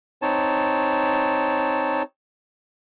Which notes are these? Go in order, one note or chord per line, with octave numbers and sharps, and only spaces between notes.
C4 D#4 C#5 A5